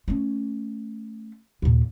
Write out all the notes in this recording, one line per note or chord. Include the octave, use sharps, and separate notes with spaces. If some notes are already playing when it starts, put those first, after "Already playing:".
A3 C#4
D#2 A#2